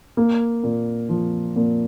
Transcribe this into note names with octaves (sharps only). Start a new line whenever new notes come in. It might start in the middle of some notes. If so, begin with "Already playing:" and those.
A#3
A#2
F3
A#2